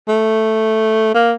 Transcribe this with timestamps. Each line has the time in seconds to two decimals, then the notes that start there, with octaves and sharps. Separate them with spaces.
0.08 A3
1.14 A#3